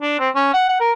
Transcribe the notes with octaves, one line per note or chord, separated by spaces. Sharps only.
D4
C4
C#4
F#5
F#5
A#4